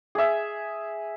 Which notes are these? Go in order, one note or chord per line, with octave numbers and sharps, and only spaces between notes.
G#4 E5